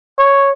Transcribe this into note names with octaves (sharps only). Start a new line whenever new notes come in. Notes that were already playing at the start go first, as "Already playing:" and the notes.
C#5